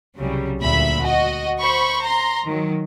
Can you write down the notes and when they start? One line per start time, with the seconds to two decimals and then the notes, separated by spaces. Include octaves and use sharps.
0.18 C2 C#3 F#3 G3
0.61 D2 A#2 E5 B5
1.02 F#4 D#5
1.60 C5 B5 C#6
2.02 A#5 C6
2.45 D#3 F#3